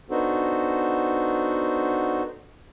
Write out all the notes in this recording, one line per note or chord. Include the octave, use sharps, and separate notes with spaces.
B3 D4 D#4 F#4 A4 C5